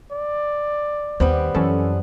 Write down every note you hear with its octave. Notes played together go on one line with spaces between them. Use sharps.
D5
D#2 G3 B3 C4
F#2 E3 C#4 A4